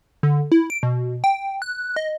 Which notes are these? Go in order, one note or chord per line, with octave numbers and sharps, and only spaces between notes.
D3
E4
D7
B2
G5
F#6
D#5